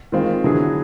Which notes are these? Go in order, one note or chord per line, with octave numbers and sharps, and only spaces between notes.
D#3 G#3 C4 F4
D3 F#3 B3 E4 G#4